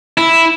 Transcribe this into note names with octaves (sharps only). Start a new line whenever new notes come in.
E4